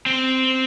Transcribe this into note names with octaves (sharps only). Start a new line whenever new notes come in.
C4